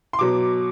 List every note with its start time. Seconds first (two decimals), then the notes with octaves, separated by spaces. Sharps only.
0.13 C6
0.19 B2 F#3 D6